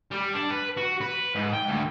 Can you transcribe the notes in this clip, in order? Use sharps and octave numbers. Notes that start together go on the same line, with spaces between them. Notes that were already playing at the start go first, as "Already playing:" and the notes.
G3
D4
B4
F#4
B4
G#2
G5
D2